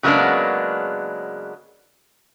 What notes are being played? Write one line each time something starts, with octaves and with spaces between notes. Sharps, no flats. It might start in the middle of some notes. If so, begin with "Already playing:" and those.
C#3 F#3 G#3 A#3 B3 D4